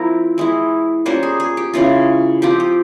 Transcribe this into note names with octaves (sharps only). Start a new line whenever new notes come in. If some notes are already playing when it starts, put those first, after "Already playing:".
Already playing: F3 C4 E4 A#4
E3 G#3 E4
G3 A#3 C#4 F4 C5
G#4
G#4
G4
C#3 E3 G#3 C#4 F4
F3 C4 F4 G4
G4